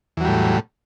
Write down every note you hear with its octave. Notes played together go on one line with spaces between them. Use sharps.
E2 A2 F#3 G3